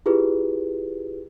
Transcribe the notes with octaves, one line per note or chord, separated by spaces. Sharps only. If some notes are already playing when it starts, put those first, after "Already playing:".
E4 F4 G4 G#4 B4